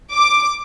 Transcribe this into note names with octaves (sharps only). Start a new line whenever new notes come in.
D6